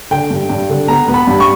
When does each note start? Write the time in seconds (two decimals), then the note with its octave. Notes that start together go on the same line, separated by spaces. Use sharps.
0.11 D3 G5
0.31 G2
0.49 G2
0.69 D3
0.88 B3 A#5
1.08 B3
1.14 B5
1.27 G2
1.40 C#6